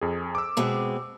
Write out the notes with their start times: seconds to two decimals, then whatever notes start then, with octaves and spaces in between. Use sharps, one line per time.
0.01 F2 G#4
0.35 D6 E6
0.57 B2 G#3 C4